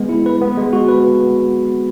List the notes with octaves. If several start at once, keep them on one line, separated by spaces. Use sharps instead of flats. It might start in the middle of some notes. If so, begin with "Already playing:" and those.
Already playing: G#3 B3
E4
B4
B3
G#3
F#4
B4